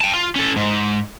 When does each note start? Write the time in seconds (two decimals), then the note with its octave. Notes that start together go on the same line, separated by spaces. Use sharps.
0.01 G5 A5
0.13 F4
0.36 C#4 A4
0.56 G#2